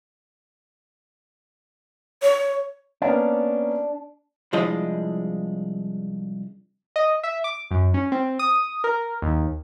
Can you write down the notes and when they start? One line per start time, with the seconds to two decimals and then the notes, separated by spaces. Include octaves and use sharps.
2.22 C#5
3.02 A#3 B3 C#4 D4
4.53 C2 F3 G#3 D4 E4 D#5
6.96 D#5
7.23 E5
7.44 D6
7.71 F#2
7.94 C#4
8.12 C4
8.39 D#6
8.84 A#4
9.22 D#2